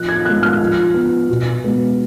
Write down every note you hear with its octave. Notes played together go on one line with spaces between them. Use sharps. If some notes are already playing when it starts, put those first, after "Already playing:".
Already playing: F3 F#6
G#6
G#3 B3 F#6
F6
F3
B3
B2
G#3 B3